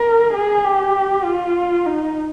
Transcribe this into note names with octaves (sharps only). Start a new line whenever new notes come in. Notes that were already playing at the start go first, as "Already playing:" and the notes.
Already playing: A#4
G#4
G4
F4
D#4